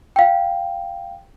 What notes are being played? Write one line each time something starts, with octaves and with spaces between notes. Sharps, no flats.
F5 G5